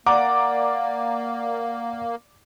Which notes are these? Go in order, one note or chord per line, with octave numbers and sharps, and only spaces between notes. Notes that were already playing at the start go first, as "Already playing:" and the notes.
A#3 D5 F#5 A#5 D6